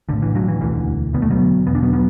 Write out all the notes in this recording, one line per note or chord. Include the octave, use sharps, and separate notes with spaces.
A1 A2 D3
E3
D3 F#3
E3
E1 D2 D3 E3
E1 D2 D3 B3
A3
F#3 B3
E1 E2 B2 B3
D4
F#3 B3
F#3 B3